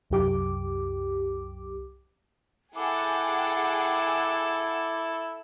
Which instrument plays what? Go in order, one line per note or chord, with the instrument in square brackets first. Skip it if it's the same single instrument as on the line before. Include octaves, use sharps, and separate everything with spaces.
[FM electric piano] C2 F#2 G4 D6
[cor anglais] E4 [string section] G#4 F#5 G5 [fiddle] A4 [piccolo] D6